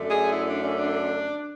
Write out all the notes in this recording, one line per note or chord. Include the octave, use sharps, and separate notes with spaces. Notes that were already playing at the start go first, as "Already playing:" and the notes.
Already playing: F#2 D3 A3
G#4
E4
D4
C#4
D4